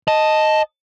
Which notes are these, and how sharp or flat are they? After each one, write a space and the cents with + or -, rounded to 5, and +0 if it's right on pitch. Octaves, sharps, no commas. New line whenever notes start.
D#5 +0 A5 +0